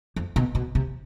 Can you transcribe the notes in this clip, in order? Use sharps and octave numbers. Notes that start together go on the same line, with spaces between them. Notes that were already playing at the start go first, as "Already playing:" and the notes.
F2
B2
B2
C3